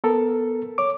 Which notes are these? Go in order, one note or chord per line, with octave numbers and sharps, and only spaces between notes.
B3 A4 A#4
C#5 D6